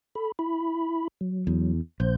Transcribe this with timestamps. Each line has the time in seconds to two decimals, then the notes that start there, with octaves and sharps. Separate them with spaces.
0.15 A4 B5
0.39 E4 B5
1.21 F#3
1.47 E2
2.00 A#1 C5 G6